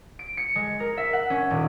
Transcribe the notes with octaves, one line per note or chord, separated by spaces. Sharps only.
D7
C#7
G#3
A#4
E5
F#5
C#4
D#1